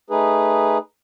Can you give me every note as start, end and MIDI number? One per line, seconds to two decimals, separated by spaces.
0.10 0.78 57
0.10 0.78 63
0.10 0.78 68
0.10 0.78 71